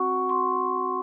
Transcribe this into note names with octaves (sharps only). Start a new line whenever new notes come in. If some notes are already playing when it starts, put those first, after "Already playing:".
Already playing: C4 F#4 F#5 C#6
C6